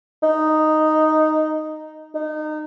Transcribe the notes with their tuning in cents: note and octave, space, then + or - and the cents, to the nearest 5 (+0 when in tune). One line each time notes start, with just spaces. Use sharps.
D#4 -5
D#4 -25